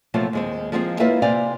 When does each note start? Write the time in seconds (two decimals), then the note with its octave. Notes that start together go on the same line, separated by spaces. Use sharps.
0.14 C3 F3 F#3 A3 A#3 F4
0.33 D#2 G#3 C4
0.72 F3 G#3 A#3 C4 D#4 F4
1.00 A#3 E4 F4 B4 C#5 E5
1.22 C3 C4 D5 F5 G#5